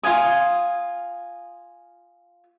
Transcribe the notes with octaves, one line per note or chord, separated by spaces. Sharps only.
F4 F5 G#5 D#6